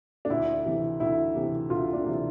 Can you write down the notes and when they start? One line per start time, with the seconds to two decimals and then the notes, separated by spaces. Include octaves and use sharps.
0.25 D4
0.30 D2 E4
0.65 C3 E3
1.00 D2 E4
1.35 C3 E3
1.70 D2 F4
1.93 D4
2.05 C3 E3